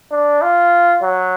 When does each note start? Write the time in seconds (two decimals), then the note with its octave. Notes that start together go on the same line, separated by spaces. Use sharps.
0.11 D4
0.42 F4
1.02 F#3